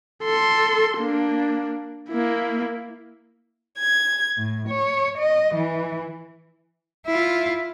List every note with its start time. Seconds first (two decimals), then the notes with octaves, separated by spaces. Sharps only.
0.24 A4 C6
0.98 A#3 D4
2.10 A#3 E4
3.78 G#6
4.37 A2
4.68 C#5
5.19 D#5
5.55 E3
7.06 E4 F4